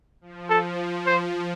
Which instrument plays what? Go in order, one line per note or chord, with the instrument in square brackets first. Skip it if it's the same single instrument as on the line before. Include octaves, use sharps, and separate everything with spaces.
[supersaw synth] F3
[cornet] A4
C5